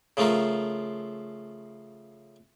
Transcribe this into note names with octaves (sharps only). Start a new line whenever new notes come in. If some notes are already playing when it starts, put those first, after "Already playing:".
C#3 F3 A3 F4 A#4